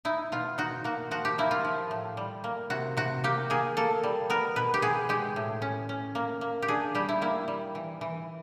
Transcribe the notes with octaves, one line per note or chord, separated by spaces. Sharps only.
D#4 E4
B2 F4
D#4 F#4
A#3 F#4
F3 F#4
G4
A#3 E4
F4
F3
A2
G3
A#3
C3 F#4
C3 F#4
A#3 G4
A#3 G#4
A#3 A4
G3
B3 A#4
B2 B4
G4
B3 G#4
G#3 G4
A2
C#4
C#4
A#3
A#3
G4
D4 G#4
G3 G4
E4
A#3 E4
G3
E3
E3